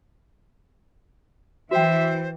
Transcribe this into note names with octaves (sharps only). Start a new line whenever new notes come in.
E3 F#4 C5 E5 G5